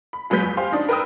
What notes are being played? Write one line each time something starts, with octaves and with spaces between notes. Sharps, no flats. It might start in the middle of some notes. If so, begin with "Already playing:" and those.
B5
A#1 F#3 G#3 B4 G6 B6
F2
G4 C5 F5 G#5 C6
D4 D#4
A#4 B4 G5 D#6 E6